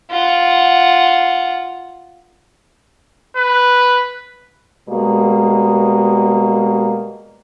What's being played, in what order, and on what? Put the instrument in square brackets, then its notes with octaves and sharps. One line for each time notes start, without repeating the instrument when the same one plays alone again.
[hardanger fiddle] F4 F#5
[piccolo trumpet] B4
[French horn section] B2 G3 G#3 A#3